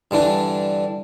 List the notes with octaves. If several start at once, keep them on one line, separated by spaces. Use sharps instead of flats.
G2 D3 E3 D4